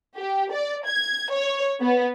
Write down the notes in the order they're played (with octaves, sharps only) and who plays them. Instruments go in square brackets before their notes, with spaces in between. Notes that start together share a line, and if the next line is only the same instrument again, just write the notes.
[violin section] G4
D5
G#6
C#5
B3